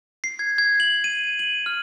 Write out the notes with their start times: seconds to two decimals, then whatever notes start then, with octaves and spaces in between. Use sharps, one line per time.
0.24 C7
0.39 G#6
0.58 G#6
0.80 F#7
1.04 D#7
1.39 F#7
1.66 F6